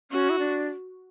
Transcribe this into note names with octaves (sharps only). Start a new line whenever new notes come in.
C#4 F#4
E4
D4